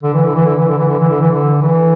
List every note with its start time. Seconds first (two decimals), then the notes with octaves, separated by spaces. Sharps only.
0.03 D3
0.14 E3
0.25 D3
0.35 E3
0.46 D3
0.56 E3
0.68 D3
0.78 E3
0.88 D3
0.99 E3
1.09 D3
1.20 E3
1.31 D3
1.62 E3